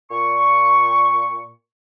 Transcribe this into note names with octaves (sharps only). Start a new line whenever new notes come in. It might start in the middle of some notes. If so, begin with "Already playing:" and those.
A#2 C#6